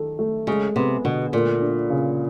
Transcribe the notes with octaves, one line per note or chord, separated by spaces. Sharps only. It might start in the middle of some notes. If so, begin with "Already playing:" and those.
Already playing: D#3 A4
A3
C#3 G#3
C3 B3
B2 D3
A#2 A3
D4
C#3